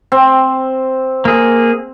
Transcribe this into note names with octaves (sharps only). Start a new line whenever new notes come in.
C4
A#3 G#4